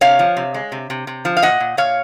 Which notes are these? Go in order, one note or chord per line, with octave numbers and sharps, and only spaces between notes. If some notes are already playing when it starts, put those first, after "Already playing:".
C3 C#5 F5
F3
C3
G#3
C3
C3
C3
F3
F5
A#2 D#5 F#5
A#2
A#2 C#5 F5